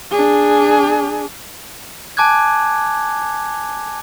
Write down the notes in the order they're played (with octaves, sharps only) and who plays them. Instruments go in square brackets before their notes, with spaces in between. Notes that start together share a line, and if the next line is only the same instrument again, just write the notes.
[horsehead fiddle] D4 G#4
[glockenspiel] G#5 A5 D6 F#6 G#6